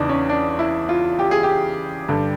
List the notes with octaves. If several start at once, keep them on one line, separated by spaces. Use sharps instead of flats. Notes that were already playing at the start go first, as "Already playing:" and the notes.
Already playing: E2 C#3 E3 D4 D#4
C#4
D4
E4
F4
G4
G#4
G4
G2 D3